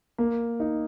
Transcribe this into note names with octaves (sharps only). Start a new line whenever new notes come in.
A#3
D#4